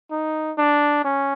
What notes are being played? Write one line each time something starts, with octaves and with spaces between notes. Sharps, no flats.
D#4
D4
C#4